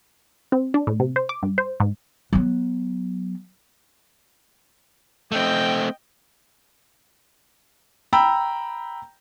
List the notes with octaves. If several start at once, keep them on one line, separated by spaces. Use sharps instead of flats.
C4
D4
A2
C3
C5
D6
G2
C5
G#2
F#3 B3
A3 C4 D#5 G5
G5 A#5 B5 E6